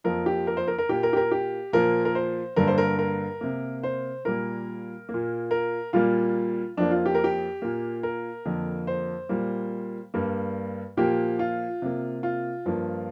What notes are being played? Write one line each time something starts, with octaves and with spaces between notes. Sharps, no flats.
F2 F3 A#3 A#4
G4
A#4
C5
A#4
A#4
A#2 A#3 G4
A#4
G4
A#4
G4
A#2 F3 A#3 A#4
A#4
C5
G2 D3 G3 A#3 A#4
C5
A#4
A#4
C3 A#3
C5
A#2 G3 A#3 A#4
A#3
A#2
A#4
A#2 G3 A#3 F4
F2 F3 A#3 D4
F4
G4
A#4
G4
A#2 A#3
A#4
F2 D3 A#3
C5
A#2 G3 A#3
G2 G3 A#3
A#2 F3 A#3 G4
F4
C3 A#3
F4
G2 F3 A#3